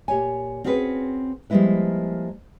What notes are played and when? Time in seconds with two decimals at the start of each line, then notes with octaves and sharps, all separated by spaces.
0.08 A#2 G4 C#5 G#5
0.64 C4 C#4 F#4 G#4 B4
1.50 F3 G3 G#3 A#3 E4 B4